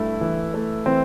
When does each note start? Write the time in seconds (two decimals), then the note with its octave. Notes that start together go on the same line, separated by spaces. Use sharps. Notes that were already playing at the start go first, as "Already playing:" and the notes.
Already playing: G2 A3 E4
0.21 E3
0.54 A3
0.86 E3 C4